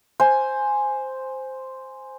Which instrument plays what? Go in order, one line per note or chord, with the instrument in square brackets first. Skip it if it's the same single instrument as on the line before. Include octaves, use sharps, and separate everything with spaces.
[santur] C5 G#5